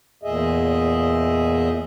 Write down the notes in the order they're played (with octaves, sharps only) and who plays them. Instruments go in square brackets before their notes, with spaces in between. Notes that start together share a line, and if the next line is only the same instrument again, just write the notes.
[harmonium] E2 A#2 G#4 D#5 E5